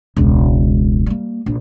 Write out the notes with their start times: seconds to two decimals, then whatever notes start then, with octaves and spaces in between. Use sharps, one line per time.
0.16 E1 C#2
1.06 G3 A#3
1.46 A#1